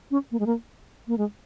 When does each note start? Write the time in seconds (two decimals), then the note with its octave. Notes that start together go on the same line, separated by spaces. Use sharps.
0.11 C#4
0.31 A#3
0.40 G#3
0.46 A#3
1.08 A#3
1.18 G#3